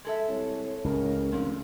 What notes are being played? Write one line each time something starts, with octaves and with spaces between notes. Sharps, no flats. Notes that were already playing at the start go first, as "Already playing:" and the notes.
G#3 A4 E5
C2 C#5
C#2 A2 C#3 A#4
F1 A#2 D3